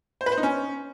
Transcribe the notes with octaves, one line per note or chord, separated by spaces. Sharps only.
C5
B4
C5
D#4
C#4